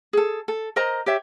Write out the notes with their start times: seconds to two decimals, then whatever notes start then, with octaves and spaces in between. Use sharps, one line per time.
0.13 G#4 A4
0.48 A4
0.76 A#4 C5 D#5 A#5
1.06 G4 C#5 E5